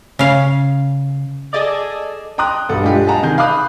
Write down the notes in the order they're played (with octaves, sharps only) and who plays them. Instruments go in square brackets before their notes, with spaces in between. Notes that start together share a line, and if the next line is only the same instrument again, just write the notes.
[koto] C#3 F5
[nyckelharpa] G#4 A4 [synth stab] D5 D#5
[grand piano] G5 A#5 C6 D#6 F#6
B1 G2 A4 F#5
G#3 D4 F4 G4 A4
G#4 D#5 F#5 A5 A#5
C3 D#3 G#4 G#5 G6
F5 B5 D6 D#6 F#6